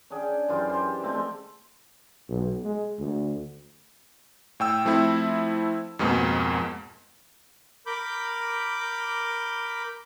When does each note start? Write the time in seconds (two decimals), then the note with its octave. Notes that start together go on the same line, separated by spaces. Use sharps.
0.10 C#4 D4 G#4 G5
0.48 F#2 E3 F4 G4
0.69 G4 C5
1.03 F3 G#3 A3 C4
2.29 B1
2.64 G#3
2.99 D2
4.60 A2 G5 E6
4.85 F3 A3 C4 E4
5.99 F2 G#2 B2 G#3 A#3
7.86 A#4 B5 D6 G6